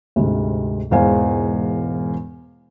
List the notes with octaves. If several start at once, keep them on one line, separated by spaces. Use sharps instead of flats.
D2 G#2 C3
E1 E2 G#2 C5 F5 G#5